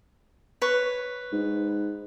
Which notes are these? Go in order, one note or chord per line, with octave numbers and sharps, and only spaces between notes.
B4 C#5
G#2